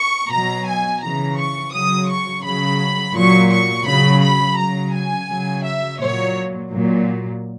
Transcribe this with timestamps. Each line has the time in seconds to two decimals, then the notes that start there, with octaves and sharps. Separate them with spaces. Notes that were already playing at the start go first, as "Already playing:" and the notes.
Already playing: C#6
0.30 B2 F#3 A#5
0.66 G#5
1.01 C#3 E3 A#5
1.37 C#6
1.72 C#3 F#3 D#6
2.08 C#6
2.43 C#3 F#3 B5
3.14 A#2 F#3 C#6
3.50 C#6
3.85 C#3 F#3 B5
4.21 B5
4.57 C#3 F#3 A#5
4.93 G#5
5.29 C#3 F#3
5.64 E5
5.99 A#2 F#3 C#5
6.71 A#2 F#3